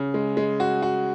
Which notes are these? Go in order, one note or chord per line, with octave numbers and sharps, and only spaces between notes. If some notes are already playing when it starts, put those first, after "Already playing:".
Already playing: C#3
G#3
G#3
F#4
F#4